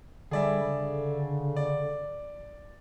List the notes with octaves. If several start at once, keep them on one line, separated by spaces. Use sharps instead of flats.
D3 G3 G#4 D5 E5
C#3
D5